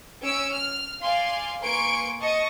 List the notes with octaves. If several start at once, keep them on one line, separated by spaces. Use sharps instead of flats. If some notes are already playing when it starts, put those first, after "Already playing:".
C#4 E6 D7
F6
D5 F5 G#5 C6
A#3 B4 G#5 C6 C#6 D7
D#5 A5 C#6 C#7